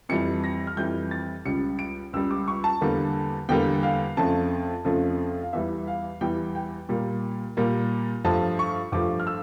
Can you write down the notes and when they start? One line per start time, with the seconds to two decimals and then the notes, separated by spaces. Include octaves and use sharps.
0.09 F2 E3 G3 C#7
0.44 A#6
0.67 F6
0.77 F2 E3 G3 G6
1.11 A6
1.45 C#2 C#3 G3 C#7
1.79 D7
2.13 C#2 C#3 G3 E6
2.31 D6
2.48 C#6
2.64 A5
2.81 E2 D3 G3 A#3
3.49 E2 D3 G3 A#3 G5
3.83 F5
4.17 F2 C#3 F3 A3 A5
4.85 F2 C#3 F3 A3
5.42 F5
5.53 E2 E3 G3 E5
5.87 F5
6.21 E2 E3 G3 G5
6.55 G5
6.89 A#2 G3 A#3
7.57 A#2 G3 A#3
8.24 G2 F3 A3 A5
8.59 C#6
8.92 G2 F3 A3 D6
9.20 F6
9.27 E6